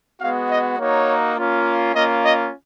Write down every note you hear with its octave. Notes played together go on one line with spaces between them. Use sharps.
G#3 B3 F#4 F5
D#5
A#3 D#4 F#4 C#5
A#3 C#4 F4
A#3 C#4 F4 D#5
D#5